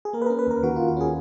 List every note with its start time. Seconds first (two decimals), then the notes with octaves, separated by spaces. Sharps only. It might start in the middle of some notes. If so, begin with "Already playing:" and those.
0.05 G#4
0.13 A#3 A#4
0.22 B4
0.26 C#4 A#4
0.39 B4
0.47 D#2 A#4
0.63 D#3 F#4
0.76 D#2 F4
0.88 F#4
0.97 C#4 G#4